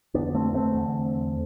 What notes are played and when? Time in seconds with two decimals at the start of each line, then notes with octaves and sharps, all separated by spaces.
0.14 F2 D3 B3 D4
0.35 A3 C4
0.54 A3 C4
0.74 E2 D3